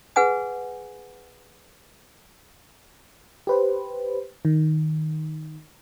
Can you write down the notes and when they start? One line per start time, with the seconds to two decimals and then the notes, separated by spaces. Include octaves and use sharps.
0.16 G#4 B4 F#5 G#5 D#6
3.47 G4 B4 C5
4.45 D#3